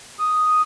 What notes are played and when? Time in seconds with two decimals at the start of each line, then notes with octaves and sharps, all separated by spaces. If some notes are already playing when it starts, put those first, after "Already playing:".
0.19 D#6